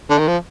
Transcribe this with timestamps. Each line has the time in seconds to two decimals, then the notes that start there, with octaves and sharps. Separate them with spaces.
0.10 D3
0.18 D#3
0.28 F3